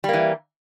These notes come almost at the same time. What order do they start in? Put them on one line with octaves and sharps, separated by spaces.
G3 A#3 E3